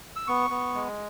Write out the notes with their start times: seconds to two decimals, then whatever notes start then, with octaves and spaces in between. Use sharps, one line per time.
0.16 E6
0.27 B3 C#6
0.50 B3
0.74 G#3